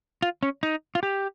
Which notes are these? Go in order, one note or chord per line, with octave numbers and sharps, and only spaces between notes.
F4
C#4
D#4
F4
G4